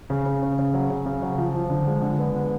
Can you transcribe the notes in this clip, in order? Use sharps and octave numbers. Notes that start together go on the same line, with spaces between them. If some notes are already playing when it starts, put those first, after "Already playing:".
C#3
C#3
C#4
C#3
F#3
C#3
C#3
F#3
F3
F3
D3
G#3
D3
B3
B3